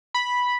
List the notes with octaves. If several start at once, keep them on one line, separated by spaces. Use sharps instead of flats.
B5